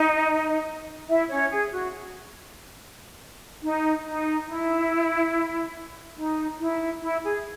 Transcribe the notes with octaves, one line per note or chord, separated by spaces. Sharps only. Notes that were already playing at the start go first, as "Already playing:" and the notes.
Already playing: D#4 D#5
E4 E5
C#4 C#5
G#4
F#4
D#4
D#4
E4
D#4
E4
E4
G#4